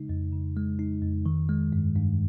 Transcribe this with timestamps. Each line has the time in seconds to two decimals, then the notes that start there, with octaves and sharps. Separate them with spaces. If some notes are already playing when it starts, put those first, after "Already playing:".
Already playing: C#3 G#3 D#4
0.09 F2
0.33 C#3
0.56 G#3
0.79 D#4
1.02 F2
1.26 D#3
1.49 G#3
1.72 G2
1.96 G2